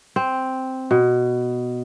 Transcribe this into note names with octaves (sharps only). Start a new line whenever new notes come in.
C4
B2